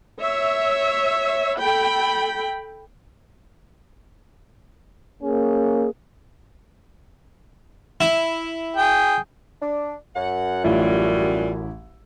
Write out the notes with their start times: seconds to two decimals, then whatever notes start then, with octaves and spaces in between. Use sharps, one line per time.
0.21 C#5 E5
1.60 A4 G5 B5
5.23 A#3 C#4 G#4
8.01 E4
8.77 G#4 G5
9.61 D4
10.16 F#2 F#5
10.64 A1 F#3 G3 A3 E4 F4